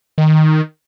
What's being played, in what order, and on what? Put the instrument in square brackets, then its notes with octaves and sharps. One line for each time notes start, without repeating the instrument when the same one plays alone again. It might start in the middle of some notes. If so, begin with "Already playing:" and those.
[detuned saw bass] D#3